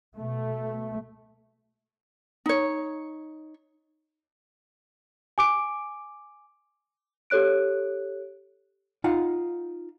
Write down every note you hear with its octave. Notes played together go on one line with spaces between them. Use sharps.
B2 A3
D#4 C#5
G#5 D6 D7
G4 A4 C#5 F#6 D7
D#4 F4 F5 F#5